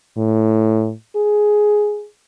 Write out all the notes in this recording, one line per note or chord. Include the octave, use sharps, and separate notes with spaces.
A2
G#4